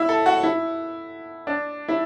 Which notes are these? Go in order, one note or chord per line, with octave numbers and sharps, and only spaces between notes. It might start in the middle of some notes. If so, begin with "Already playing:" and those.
Already playing: E4
A4
F#4
E4
D4
E4